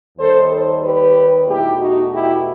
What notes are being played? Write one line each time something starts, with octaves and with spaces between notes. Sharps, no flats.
D#2 D#3 G3 D#4 A4 C5
A4 C5
G4 B4
E2 B2 A3 D#4 E4 G4
D#4 F#4
E4 G4